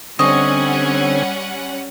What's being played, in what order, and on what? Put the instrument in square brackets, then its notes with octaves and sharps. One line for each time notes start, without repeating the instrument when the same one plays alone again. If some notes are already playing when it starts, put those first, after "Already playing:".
[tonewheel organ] D3 C4 G#5 [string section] G3 C#4 F#5 [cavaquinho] C#5 D#5